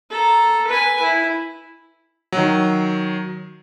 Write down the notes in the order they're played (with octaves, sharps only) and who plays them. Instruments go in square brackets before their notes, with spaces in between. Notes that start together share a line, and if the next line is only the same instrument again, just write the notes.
[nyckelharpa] A4 A#5
B4 G#5
E4
[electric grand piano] D#3 F#3